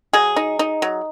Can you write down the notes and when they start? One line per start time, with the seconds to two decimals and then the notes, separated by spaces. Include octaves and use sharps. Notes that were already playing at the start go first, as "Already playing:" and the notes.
0.13 F#3 G#4
0.36 D#4
0.59 D#4
0.82 F#3